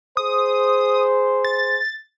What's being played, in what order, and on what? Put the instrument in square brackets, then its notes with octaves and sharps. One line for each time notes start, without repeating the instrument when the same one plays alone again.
[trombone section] G#4 C5 [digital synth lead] D#6
[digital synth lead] A6